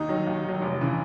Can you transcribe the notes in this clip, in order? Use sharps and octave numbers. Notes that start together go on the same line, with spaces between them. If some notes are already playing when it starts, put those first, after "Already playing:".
Already playing: D#2 D#4
D#3 F#3
D#2
D#3 F#3
F1
C#3 E3